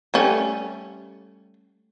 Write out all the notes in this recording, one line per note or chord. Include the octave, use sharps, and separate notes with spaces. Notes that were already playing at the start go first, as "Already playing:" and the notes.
G3 A3 C#4